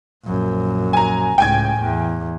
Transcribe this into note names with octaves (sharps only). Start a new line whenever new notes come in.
A#1 F#2
G#5 A#5
C#2 A2 G5 G#5 G#6
E2